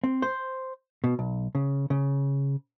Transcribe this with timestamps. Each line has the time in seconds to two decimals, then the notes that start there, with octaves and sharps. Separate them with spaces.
0.04 C4
0.22 C5
1.04 B2
1.19 B1
1.55 C#3
1.90 C#3